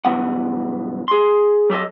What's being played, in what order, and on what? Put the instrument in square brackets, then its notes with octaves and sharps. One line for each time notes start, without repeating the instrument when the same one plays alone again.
[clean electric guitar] B1 G2 A#2 E3 B3 F#5
G#4 C6
F#3 G4 A4 D#5